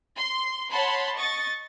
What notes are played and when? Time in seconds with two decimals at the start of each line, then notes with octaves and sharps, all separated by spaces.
0.17 C6
0.70 C#5 F#5 A5 B5 C6
1.16 D#5 C#6 A6